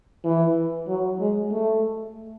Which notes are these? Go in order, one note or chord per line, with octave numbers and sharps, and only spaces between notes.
E3
F#3
G#3
A3